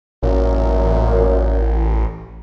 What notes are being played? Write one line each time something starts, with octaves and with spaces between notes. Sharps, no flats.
A1 F#2 A#2